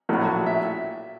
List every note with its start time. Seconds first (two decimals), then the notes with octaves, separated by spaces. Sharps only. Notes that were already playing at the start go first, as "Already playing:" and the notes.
0.09 A#1 A2 F#3
0.46 E5